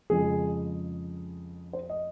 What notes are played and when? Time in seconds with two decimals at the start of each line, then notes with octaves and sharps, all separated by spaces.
0.10 F2 C#3 F3 G#3 G#4
1.73 C5
1.89 D#5